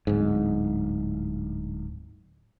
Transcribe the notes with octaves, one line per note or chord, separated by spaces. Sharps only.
D1 G#2